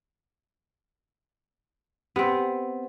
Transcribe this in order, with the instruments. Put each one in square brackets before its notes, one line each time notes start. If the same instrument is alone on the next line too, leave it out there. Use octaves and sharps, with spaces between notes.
[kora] B3 C4 [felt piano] G4